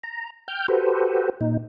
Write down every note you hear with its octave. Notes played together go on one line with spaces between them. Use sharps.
A#5
G5 F6 G6
F#4 G4 A4 B4 C5
A#2 D#4